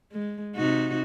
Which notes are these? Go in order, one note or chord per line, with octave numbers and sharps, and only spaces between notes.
G#3
C3 D#4 F#4